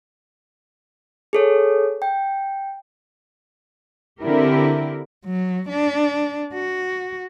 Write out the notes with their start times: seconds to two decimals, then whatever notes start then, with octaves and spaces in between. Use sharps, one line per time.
1.33 G#4 A4 C#5
2.02 G5
4.21 D3 C4 E4 G4 A#4
5.25 F#3
5.69 D4
6.54 F#4